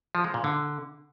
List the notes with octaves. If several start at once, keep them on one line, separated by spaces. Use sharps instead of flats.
F3
G#3
A#2
D3